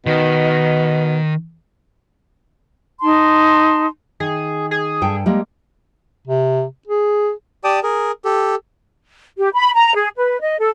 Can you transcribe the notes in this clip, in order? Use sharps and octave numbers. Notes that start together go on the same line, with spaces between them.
B2 D#3
D#4 A5 C6
D#3 G#4
G#4
G2 A4 G5
G3 G#3 A#3
C3
G#4
G4 D5 G5 A5 D#6
G#4 A#4
G4 A4
G4
B5
A#5
G#4
B4
D#5
A4